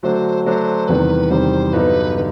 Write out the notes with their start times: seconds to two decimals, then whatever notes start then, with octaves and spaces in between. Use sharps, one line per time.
0.03 D3 F#3 A3 D4 F#4 C5
0.45 D3 F#3 A3 D4 F#4 C5
0.88 E2 C3 D#3 G3 B4
1.30 E2 C3 D#3 G3 C5
1.73 G2 D3 F#3 B3 D#4 B4
2.16 D3 B4